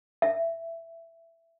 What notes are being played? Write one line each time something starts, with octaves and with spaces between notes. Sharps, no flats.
E5